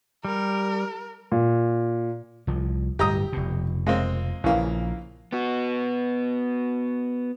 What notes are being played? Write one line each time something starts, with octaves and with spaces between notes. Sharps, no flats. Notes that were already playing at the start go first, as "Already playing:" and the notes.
G3 A#4
A#2
C2 F3
D1 G2 G3 G4 A#5 D#6
F1 B2
G#3 A#3 C4
A#1 C#3 E3 A#3
B3 F#4